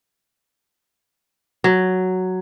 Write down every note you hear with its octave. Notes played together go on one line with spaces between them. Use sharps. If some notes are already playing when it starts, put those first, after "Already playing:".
F#3